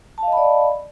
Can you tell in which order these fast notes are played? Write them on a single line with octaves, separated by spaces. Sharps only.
A5 F5 D#5 B5 D5